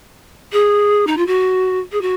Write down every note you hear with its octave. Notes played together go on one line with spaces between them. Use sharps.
G#4
D#4
F4
F#4
G#4
F#4